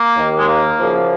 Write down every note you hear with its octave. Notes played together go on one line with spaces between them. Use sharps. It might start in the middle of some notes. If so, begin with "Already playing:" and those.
Already playing: A#3
D#2 D#3
G#3
A#3
F#2 C#3 F3